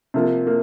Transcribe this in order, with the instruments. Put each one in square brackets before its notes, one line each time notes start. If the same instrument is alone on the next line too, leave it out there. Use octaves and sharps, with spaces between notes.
[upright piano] C3 F3 A#3
A#3